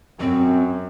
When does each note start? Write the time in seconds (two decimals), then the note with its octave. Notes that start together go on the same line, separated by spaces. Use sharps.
0.20 F#2 C4